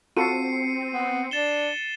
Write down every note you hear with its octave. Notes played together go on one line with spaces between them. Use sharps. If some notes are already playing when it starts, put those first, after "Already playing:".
C4 F4 F#4 A4 C7 C#7 D#7
B3
D4 A6 E7 G7